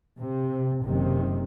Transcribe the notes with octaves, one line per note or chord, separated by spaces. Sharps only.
C3
F#1 C3 D#3